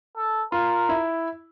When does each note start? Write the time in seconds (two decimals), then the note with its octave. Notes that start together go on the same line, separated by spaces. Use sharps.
0.17 A4
0.52 F4 A#4
0.89 E4